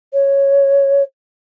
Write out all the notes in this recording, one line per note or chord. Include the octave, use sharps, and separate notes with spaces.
C#5